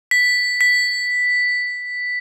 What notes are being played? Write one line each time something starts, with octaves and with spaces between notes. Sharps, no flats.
B6
B6